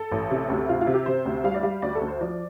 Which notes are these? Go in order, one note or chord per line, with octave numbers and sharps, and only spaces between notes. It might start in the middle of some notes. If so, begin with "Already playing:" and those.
Already playing: A4
A1
C3
D2
C3 F4
F4
C3
G4
C3 C5
D2
G3 F5
D5
G3 F5
D2 D5
A4
D2
C5
F3 D5